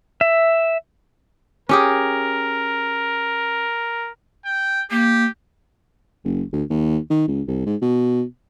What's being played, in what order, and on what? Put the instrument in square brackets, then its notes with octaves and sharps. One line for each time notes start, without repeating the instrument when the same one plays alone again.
[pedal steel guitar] E5
[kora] C#4 G4 G#4 [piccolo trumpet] A#4
[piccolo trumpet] G5
[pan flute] A#3 [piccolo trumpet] G4
[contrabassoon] F#1
D2
D#2
D#3
C#2
C2
G#2
B2